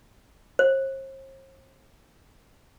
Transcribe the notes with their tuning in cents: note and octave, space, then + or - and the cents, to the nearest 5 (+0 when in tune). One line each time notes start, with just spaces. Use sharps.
C5 +45